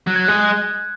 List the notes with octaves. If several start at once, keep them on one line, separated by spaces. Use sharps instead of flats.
F#3 F#6
G#6
G#3 F#6